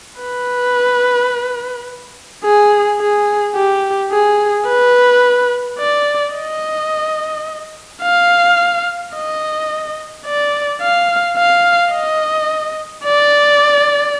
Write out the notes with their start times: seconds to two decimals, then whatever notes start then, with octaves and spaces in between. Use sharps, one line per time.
0.21 B4
2.44 G#4
3.00 G#4
3.56 G4
4.11 G#4
4.67 B4
5.79 D5
6.35 D#5
8.02 F5
9.14 D#5
10.26 D5
10.82 F5
11.38 F5
11.93 D#5
13.05 D5